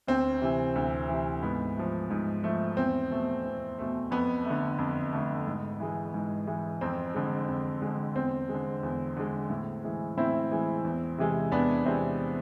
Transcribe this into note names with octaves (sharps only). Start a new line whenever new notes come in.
D2 C4
C3 E3
D2
C3 E3
G#2 B3
F3 A3
G#2
F3 A3
E2 C4
B2 A3
E2
B2 A3
F2 B3
A3
D3
F2
D3 A3
G#2
E3 G#3
G#2
E3 G#3
F2 C4
D3 G#3
F2
D3 G#3
E2 C4
D3 G#3
E2
D3 G#3
A2
E3 G#3
A2 C4 E4
E3 G#3
E2
C3 E3 G#3
E2 B3 D4
C3 E3 G#3 C4